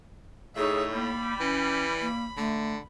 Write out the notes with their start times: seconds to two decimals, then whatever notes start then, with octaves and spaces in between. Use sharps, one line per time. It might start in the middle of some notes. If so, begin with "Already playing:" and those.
0.56 A2 C#3 G3 D#4 G#4 C#5 E5
0.92 G3 A#3 B5
1.40 E3 C#4
2.01 A#3
2.37 D3 A3